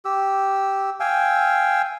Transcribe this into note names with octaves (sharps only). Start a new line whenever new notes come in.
G4 E6
F5 G5 G#5 E6